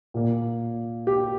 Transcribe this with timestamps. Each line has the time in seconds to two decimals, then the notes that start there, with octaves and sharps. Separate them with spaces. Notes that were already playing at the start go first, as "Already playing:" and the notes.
0.14 A#2 A#3
1.07 G4